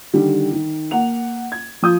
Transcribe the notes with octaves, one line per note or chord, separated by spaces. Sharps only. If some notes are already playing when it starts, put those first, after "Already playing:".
D3 D#3 G3
D#3
A#3 F#5 F7
G#6
F3 F4 D#6 G6